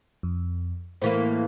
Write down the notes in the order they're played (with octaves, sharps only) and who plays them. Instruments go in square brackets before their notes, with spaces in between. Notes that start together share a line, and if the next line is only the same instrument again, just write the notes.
[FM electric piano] F2
[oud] A2 E3 A#3 [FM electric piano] C5